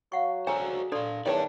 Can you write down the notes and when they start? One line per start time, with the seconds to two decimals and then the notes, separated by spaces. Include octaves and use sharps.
0.12 F#3 F5 F#5 C#6
0.47 F#4 G#4 A4 C5 C#5 G#5 A#5
0.92 D4 A4 D5 F5 C6
1.26 E2 D#3 C#5 D5 G5 A5